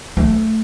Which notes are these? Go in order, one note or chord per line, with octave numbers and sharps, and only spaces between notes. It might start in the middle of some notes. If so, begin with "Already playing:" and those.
A3